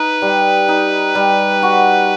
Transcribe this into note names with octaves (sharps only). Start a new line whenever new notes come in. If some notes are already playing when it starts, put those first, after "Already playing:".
Already playing: D#4 B4
G3
D#4
G3
F#4